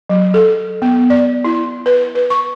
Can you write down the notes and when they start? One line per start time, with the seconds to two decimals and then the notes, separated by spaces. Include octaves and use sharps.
0.10 F#3
0.34 A4
0.82 B3
1.10 D5
1.45 E4
1.86 B4
2.15 B4
2.30 C#6